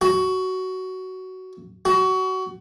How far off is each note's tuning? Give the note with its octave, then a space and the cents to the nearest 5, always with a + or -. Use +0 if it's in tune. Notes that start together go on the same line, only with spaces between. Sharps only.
F#4 +15
F#4 +25